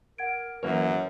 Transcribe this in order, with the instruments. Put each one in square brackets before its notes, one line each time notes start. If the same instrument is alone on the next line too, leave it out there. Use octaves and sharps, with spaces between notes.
[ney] A#4 [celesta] F#5 G#6 D7
[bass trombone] F#2 [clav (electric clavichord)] E3 A#3 C#5 [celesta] B4